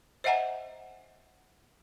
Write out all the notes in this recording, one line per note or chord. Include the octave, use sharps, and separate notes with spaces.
C5 D#5 E5 F#5 G#5 A#5